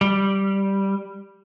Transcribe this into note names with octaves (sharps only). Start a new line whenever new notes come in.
G3